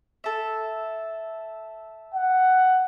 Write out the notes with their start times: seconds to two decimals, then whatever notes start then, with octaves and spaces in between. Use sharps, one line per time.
0.24 A4 E5
2.13 F#5